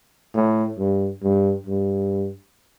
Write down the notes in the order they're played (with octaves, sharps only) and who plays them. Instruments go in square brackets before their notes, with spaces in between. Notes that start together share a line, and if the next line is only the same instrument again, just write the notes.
[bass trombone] A2
G2
G2
G2